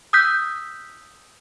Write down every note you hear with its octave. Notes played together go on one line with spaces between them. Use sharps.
D#6 E6 F#6 G6 B6